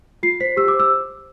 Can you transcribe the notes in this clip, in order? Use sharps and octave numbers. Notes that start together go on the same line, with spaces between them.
F4 C7
C5 B6
G4 E6
D6
C5
E6